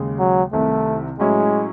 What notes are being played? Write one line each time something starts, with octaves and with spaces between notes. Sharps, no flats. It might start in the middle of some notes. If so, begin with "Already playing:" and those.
Already playing: D#2 C#3 G#3
F#3
C2 C3 D#3 A3
A2 F#3 G#3 C#4 E4